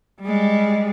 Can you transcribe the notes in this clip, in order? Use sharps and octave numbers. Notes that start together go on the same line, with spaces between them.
G3 G#3